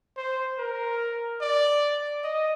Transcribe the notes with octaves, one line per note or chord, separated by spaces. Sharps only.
C5
A#4
D5
D#5